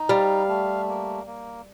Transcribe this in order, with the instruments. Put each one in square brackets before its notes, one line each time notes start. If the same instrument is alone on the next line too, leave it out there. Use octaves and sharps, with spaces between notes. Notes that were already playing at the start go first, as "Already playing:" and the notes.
Already playing: [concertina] D#4
[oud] G3 [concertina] F5
[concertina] A3
A#3
A#3